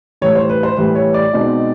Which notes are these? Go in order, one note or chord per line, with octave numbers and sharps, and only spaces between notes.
A2 E3 G3 C#5
C5
B4
C5
A2 E3 G3 B4
C#5
D5
B2 G#3 C4 D#4